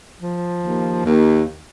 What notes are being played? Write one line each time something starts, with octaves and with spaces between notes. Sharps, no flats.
F3
D#2
D#2